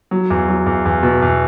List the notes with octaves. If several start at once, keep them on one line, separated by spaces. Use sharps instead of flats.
F#3
E2
F#3
E2
E2
B2
E2